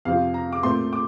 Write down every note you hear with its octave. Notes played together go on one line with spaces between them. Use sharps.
F2 C3 F3 C4 F5
A#5
D6
A#2 A3 C4 C6
D6